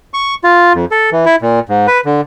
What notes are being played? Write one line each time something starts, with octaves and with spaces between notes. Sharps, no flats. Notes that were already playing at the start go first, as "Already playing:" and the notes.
C#6
F4
F2
A4
E3
E4
A#2
G#2
B4
D3